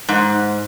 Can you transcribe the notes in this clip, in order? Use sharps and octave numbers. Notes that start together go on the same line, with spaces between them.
G#2